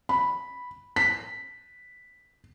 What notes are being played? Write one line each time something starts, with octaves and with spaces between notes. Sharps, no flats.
B5
B6